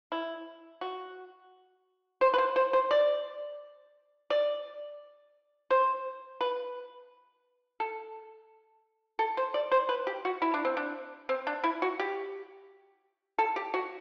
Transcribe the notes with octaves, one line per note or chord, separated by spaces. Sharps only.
E4
F#4
C5
B4
C5
C5
C5
D5
D5
C5
B4
A4
A4
C5
D5
C5
B4
G4
F#4
E4
D4
C4
D4
C4
D4
E4
F#4
G4
A4
G4
F#4